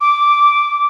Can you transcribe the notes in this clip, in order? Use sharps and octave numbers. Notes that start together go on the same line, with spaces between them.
D6